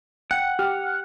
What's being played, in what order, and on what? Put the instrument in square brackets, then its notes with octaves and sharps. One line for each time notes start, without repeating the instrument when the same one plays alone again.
[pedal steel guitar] F#5 [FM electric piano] G5
[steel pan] G4 [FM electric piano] F6